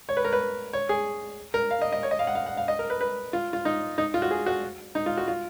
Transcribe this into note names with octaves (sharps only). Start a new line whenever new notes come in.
C#5
B4
A#4
B4
C#5
G#4
A#4
F5
D#5
D#5
C#5
D#5
F5
F#5
F5
F#5
F5
D#5
A#4
B4
B4
F4
F4
D#4
D#4
F4
F#4
G#4
F#4
D#4
F4
F#4
F4